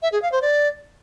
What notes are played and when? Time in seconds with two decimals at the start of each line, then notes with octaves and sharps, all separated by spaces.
0.02 E5
0.12 G#4
0.22 F5
0.32 C5
0.42 D5